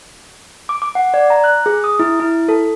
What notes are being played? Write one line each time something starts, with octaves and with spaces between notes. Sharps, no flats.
D6
D6
F#5
D5
A#5
F#6
G#4
D#6
E4
E4
A4